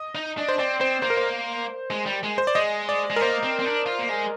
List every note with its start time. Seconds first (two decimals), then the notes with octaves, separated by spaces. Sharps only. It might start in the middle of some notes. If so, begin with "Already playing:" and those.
Already playing: D#5
0.15 D#4
0.38 D4
0.49 C5
0.59 C4 D5
0.80 C4 C5
1.02 A#3 C5
1.10 A#4
1.17 C5
1.90 G#3
2.06 G3
2.23 G#3
2.38 C5
2.47 D5
2.55 G#3 D#5
2.89 D5
3.10 G#3
3.16 A#4
3.21 A#3 C5
3.43 C4
3.59 C4
3.65 D4
3.86 F4
3.99 A#3
4.09 G#3